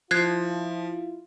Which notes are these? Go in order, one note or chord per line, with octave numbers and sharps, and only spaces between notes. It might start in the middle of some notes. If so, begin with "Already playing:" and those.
F3 E4 F4 F#6 G#6 C7